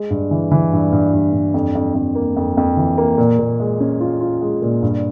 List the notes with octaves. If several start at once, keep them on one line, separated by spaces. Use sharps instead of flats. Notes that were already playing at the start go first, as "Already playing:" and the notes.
Already playing: G#3
G2
E3
E3
G2
G2
G2
G2
F2
F2
F2
A#3
F2
F2
E3
A#3
A#2
A#2
G#3
C#4
F4
F4
G#3
A#2
G2